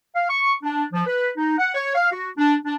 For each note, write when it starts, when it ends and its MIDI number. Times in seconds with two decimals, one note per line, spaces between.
0.15 0.25 77
0.28 0.52 85
0.63 0.85 62
0.93 1.03 53
1.07 1.31 71
1.37 1.53 63
1.58 1.70 78
1.74 1.91 73
1.95 2.10 77
2.11 2.29 66
2.38 2.55 62
2.65 2.74 62